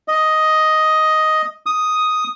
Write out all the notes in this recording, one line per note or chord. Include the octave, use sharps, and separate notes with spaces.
D#5
D#6